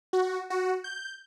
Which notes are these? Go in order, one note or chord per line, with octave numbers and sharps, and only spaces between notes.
F#4
F#4
G6